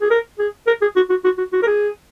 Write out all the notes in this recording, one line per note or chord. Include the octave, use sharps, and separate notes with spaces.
G#4
A#4
G#4
A#4
G#4
F#4
F#4
F#4
F#4
F#4
A#4
G#4